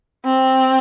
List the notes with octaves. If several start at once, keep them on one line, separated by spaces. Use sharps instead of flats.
C4